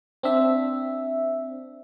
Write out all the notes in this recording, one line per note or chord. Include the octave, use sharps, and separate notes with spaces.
C4 D4 E5